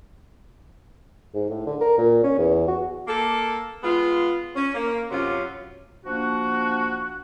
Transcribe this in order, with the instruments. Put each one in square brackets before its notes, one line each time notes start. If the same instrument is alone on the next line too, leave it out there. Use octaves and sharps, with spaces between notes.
[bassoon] G#2
A2
D3
A#4
A#2
C#4
E2
F#4
[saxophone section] A#3 A4
G#3 B3 F4
C#4
A#3
F#2 C3 F#3 C#4 F4
[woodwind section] F3 A#3 D4 F#4